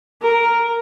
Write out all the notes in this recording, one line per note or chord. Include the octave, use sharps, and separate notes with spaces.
A#4